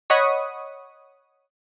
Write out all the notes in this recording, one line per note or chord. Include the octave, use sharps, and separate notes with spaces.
C#5 D#5 F#5 B5 C#6 D#6